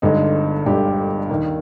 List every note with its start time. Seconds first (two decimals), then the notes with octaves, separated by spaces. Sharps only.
0.02 G1 G2 D3 G#3 D#4
0.66 G1 G2 D3 G#3 G4
1.30 D#2 D#3 A#3